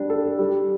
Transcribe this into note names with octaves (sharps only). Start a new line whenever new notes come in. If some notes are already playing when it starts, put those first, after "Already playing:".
Already playing: G3 D4
A4
G3